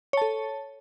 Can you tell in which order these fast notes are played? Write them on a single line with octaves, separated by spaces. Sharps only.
C#5 A5 A4